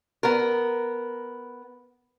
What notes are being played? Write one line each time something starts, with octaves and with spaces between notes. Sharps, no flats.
B3 A#4